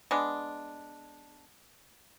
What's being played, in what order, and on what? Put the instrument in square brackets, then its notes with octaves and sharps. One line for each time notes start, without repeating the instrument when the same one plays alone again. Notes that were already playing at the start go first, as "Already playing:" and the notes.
[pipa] G#3 B3 D4